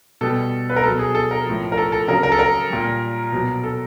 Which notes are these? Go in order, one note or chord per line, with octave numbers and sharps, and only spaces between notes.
B2 G3 A4
B4
A#4
B2 F#3 A4
G#4
A4
A#4
A2 F3
A#4
A4
A4
C#3 F#3 A#4
A#4
A4
A#4
A#2 G3
B2 F#3
A4